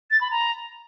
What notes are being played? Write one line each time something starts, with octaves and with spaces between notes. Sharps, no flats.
A6
B5
A#5